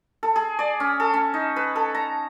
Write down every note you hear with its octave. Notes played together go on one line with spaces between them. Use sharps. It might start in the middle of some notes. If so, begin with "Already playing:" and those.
A4
G#4
D5
C#4
A4
C#4
D#4
B4
A4
A#5